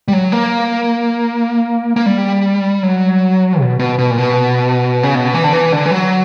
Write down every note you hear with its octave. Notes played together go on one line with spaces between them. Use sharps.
G3
F#3
A#3
A#3
G3
F#3
B2
B2
B2
A#2
B2
C#3
B2
E3
D3
E3
D3
E3
F#3